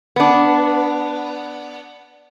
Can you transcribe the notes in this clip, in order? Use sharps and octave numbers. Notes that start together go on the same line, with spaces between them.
B3 D4